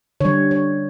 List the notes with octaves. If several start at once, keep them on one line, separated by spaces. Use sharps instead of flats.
D3 G3 C#5
C#5